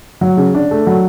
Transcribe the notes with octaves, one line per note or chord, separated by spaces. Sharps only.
F#3
C#3
D4
A3
F#3